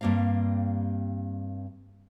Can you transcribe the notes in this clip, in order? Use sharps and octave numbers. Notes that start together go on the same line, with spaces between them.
G2 G3 A#3 C4 F5